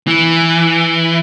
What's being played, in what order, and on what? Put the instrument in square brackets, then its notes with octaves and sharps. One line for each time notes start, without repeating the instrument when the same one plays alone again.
[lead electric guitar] E3